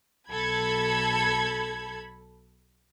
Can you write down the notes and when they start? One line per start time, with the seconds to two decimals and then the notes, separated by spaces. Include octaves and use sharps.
0.31 B1 A4 B5 G#6